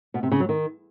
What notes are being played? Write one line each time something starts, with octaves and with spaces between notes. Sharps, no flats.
B2
C3
C#3
F#3
D#3